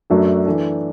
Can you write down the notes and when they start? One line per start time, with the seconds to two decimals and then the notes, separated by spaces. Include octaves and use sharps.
0.10 F#2 F#3 A3 D4 F#4
0.46 E3 D4 A4